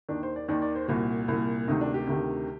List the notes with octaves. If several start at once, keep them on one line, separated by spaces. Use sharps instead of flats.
D#2 D#3 D4
C5
D5
D#2 D#3 D5
D5
C5
C2 A#2 F#4
C2 A#2
D2 C3 D#3 D#4
D4
G4
D2 C3 D#3